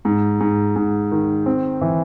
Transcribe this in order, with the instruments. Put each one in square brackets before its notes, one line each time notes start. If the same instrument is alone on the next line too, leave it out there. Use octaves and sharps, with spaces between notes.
[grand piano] G#2
G#2
G#2
D#3
C4
E3